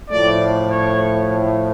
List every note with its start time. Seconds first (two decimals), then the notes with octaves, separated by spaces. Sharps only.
0.10 A2 F3 A3 D5
0.71 C#5